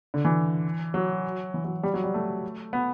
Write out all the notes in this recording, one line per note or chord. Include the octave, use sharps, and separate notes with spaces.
D3
E3
F#3
E3
F#3
G3
F#3
G3
A3
B3